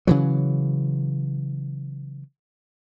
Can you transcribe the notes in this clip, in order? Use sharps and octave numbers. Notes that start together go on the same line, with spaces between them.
C#3 E3 F#3